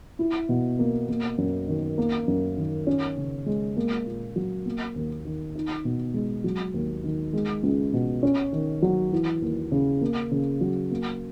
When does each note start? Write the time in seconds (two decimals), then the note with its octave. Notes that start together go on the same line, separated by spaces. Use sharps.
0.19 E4
0.49 B2
0.79 A#3
1.08 A#3
1.38 F#2
1.68 D#3
1.98 A#3
2.28 F#2
2.57 D#3
2.87 C#4
3.17 C#3
3.46 G#3
3.77 A#3
4.06 A#2
4.36 F#3
4.66 A#3
4.96 D#2
5.25 D#3
5.55 D#4
5.85 B2
6.14 G#3
6.44 F#3
6.74 D#2
7.04 D#3
7.33 G#3
7.63 C#2
7.93 B2
8.23 C#4
8.53 D#3
8.82 F#3
9.12 E3
9.42 D#2
9.72 C#3
10.01 A#3
10.32 C#3
10.61 F#3
10.91 A#3